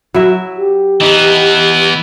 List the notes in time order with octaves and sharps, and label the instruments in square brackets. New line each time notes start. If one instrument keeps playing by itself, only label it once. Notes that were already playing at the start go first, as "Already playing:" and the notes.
[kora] F#3 E4 E5
[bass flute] G4
[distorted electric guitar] E3 B3 [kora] D#4